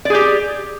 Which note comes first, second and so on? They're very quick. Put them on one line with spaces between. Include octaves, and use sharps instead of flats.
D5 G#4 G4